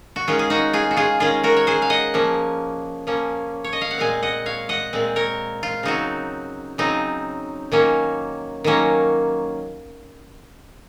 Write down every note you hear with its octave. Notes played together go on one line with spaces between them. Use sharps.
F#4
D#3 G#3 C#4 F4
G#4
D#4 F#4
F4 G#4
F#4
F4 G#4
D#3 G#3 C#4 F4 G#4
F#4 A#4
C#5
G#4 C5
F5
D#5 F#5
F3 A#3 C#4
F3 A#3 C#4
C#5
D#5
F5
F#5
A#2 G#3 C4 F5 G#5
D#5 F#5
C#5 F5
D#5 F#5
A#2 G#3 C4
A#4 C#5
F4
C#3 F#3 C4 D#4 F#4
C#3 F#3 C4 D#4
D#3 F#3 A#3 C#4
D#3 F#3 A#3 C#4